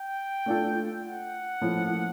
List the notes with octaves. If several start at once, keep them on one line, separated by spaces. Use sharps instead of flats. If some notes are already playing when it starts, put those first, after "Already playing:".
Already playing: G5
A3 D4 F4 A4
F#5
A#2 F3 A3 C#4 E4